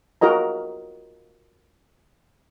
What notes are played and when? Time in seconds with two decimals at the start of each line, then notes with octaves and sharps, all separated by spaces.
0.21 F4 F#4 A#4 D#5 A#5